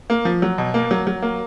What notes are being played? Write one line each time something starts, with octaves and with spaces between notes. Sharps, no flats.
A#3
F3
F#3
B2
A#3
F#3
F#3
A#3